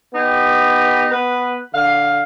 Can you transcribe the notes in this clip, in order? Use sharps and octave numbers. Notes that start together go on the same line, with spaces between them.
B3 D#4 G4
B3 B4
D3 F5